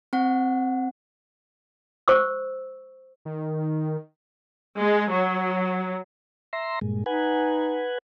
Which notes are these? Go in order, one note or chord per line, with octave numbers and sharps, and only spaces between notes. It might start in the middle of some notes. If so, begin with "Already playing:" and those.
C4 F#5
C5 C#6 E6
D#3
G#3
F#3
E5 A#5 C6
G2 A#2 G#3
D#4 B4 F#5 G#5